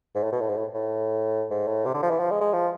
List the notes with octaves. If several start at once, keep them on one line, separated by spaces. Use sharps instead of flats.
G#2
A2
B2
A2
G#2
A2
A2
G#2
A2
C3
D3
F3
E3
F3
G#3
G#3
F3